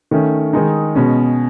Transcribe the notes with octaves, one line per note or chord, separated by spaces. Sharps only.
D#3 A3 C#4
D#3 G#3 D#4
B2 G#3 C#4